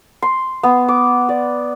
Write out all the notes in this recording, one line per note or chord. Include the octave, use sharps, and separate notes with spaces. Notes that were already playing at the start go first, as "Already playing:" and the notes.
C6
B3
D6
D5